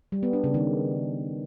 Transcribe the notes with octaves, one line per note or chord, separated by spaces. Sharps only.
G3
B3
D4
C#3
D#3